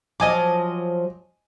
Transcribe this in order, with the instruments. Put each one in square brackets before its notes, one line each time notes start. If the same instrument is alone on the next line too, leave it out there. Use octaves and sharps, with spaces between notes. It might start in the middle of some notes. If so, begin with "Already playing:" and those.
[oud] F3 F#3 [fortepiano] D#5 G#5 D6